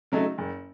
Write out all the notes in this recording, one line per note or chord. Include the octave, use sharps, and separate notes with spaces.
C#3 F#3 A3 D#4
F#1